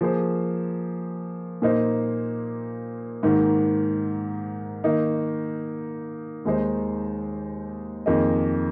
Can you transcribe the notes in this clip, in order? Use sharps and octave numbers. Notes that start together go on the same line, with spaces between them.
F3 A#3 G#4 C5
A#2 A#3 D#4 C5
G#2 D#3 A#3
D#3 A#3 D#4
D#2 D#3 G#3 D#4 C5
F2 D#3 A#3 G#4 D#5